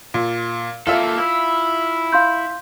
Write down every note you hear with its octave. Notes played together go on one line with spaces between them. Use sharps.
A#2
A#3 F4 A4 E5
E4
F5 C6 G6